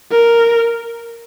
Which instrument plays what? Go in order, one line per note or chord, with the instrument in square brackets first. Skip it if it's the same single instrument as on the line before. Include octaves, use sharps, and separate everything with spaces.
[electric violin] A#4